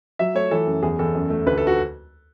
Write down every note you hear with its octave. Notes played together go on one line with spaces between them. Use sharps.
F#3 E5
A3 C#5
E3 A4
F#2
E2 G#4
E2 A4
F#2
A3
D2 B4
A4
F#4